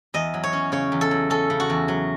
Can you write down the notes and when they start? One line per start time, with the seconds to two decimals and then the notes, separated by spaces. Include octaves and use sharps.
0.14 E2 D#5
0.34 F#3
0.43 C#5
0.53 C#4
0.72 C#3 C#5
0.92 E2
1.01 A4
1.11 F#3
1.30 C#4 A4
1.50 C#3
1.60 F#4
1.70 E2
1.88 F#3